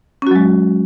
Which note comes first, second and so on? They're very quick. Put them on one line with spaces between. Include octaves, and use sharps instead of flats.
C#4 F#4 F#3 G#3